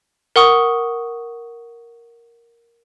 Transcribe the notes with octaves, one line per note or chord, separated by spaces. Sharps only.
A#4 F#5 C#6 D#6